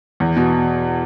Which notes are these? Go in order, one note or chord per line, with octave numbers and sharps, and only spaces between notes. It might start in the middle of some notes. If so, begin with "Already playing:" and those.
E2
B2